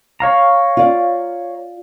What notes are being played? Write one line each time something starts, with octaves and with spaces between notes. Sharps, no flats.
C#5 F5 A#5
F4 D5